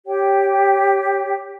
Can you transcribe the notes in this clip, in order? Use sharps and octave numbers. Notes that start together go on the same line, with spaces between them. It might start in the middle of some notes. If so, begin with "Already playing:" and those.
G4 C#5 G5